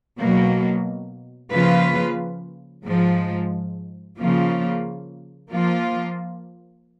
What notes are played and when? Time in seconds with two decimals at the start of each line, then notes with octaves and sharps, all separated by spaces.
0.19 B2 F#3 A#3
1.52 C#3 F3 A#3 F4 B4
2.85 G#2 F3 G#3
4.19 C#3 F3 A#3 F4
5.53 F3 A#3 F4